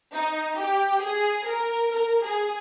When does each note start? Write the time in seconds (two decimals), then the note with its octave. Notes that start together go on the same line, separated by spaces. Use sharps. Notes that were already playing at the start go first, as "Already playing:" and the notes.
0.12 D#4
0.57 G4
1.02 G#4
1.47 A#4
1.91 A#4
2.22 G#4